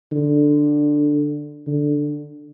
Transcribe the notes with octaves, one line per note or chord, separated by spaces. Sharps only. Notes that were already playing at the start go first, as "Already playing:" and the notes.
D3
D3